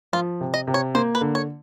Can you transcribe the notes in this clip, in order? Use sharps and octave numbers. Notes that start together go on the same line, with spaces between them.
F3 F4
C3
D#5
C3
C#5
A#3 C5
B4
D3
C#5